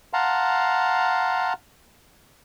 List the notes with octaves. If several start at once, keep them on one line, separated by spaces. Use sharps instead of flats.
F5 F#5 A5 A#5 C6